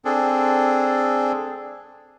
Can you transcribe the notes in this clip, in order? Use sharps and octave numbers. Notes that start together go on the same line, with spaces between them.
C4 D4 G#4 A4